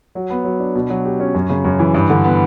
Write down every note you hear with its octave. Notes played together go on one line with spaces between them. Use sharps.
F#3
B3
F#3
D4
B2
F#3
G4
C#4
F#2
C#3
F#2
E3
G2
D3
B3